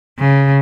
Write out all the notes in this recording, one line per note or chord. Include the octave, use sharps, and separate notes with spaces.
C#3